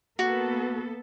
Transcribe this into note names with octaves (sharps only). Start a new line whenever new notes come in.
A#3 B3 F#4 A4